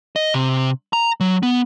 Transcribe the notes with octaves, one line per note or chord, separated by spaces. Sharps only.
D#5
C3
A#5
F#3
B3